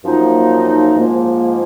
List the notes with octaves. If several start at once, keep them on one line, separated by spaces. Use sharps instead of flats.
F#2 F3 A#3 D#4
G#2 F3 A#3